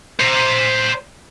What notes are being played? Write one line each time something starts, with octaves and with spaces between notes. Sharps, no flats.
C5 A#5